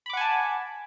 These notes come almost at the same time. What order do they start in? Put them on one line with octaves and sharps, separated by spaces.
B5 D6 F#5 G#5 A5